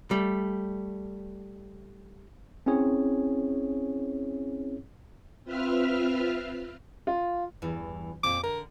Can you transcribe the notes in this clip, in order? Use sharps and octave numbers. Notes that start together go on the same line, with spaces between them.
G3 A3
C4 C#4 E4 G#4 C#5
C4 F4 B4 E5 F6
F4
E2 G2 E3
F2 A#2 C4 D6
D3 A#4